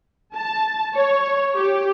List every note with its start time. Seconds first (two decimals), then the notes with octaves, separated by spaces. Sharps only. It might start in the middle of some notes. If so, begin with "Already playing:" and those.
0.35 A5
0.94 C#5
1.57 G4